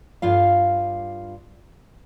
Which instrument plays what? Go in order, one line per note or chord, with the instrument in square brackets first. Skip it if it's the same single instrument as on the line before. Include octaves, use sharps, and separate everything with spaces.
[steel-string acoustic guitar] G2 F4 F5